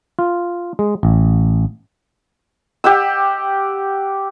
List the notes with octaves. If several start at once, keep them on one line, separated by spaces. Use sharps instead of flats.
F4
G#3
A1
G4 F#5 E6